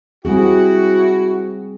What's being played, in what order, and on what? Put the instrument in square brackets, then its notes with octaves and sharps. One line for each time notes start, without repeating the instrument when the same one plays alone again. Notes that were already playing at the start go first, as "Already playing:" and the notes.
[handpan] G3 C4 G#4 [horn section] E4 F#4